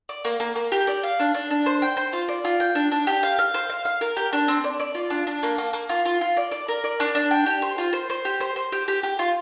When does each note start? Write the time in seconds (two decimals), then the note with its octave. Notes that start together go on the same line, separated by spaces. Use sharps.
0.09 D5
0.25 A#3
0.40 A#3
0.56 A#3
0.72 G4
0.87 D5
1.03 F5
1.19 D4
1.34 D4
1.50 D4
1.66 C5
1.82 G5
1.97 C5
2.13 F4
2.29 D5
2.44 F4
2.60 G5
2.75 D4
2.92 D4
3.07 G4
3.23 F5
3.39 F5
3.54 C5
3.70 F5
3.85 F5
4.01 A#4
4.16 G4
4.33 D4
4.48 C4
4.64 D5
4.80 D5
4.95 F4
5.10 D4
5.27 D4
5.43 A#3
5.58 A#3
5.73 A#3
5.89 F4
6.05 F4
6.21 F4
6.37 D5
6.52 D5
6.68 A#4
6.84 D5
7.00 D4
7.15 D4
7.31 G5
7.46 G4
7.62 C5
7.78 F4
7.93 C5
8.10 C5
8.25 G4
8.40 C5
8.56 C5
8.72 G4
8.88 G4
9.03 G4
9.19 F4